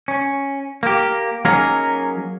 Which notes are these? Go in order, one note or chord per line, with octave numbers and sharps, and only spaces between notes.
C#4
A#3 G4
F#3 A#3 C#4 D#4 G#4 A#4